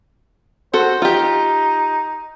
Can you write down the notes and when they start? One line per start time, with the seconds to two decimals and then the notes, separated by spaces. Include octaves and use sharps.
0.74 F#4 A4 C5
1.02 D#4 F4 G4